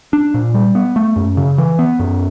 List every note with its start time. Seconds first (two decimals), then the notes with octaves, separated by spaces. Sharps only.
0.13 D4
0.34 A#2
0.54 G3
0.75 B3
0.96 A3
1.16 F#2
1.37 C#3
1.58 E3
1.79 B3
1.99 F#2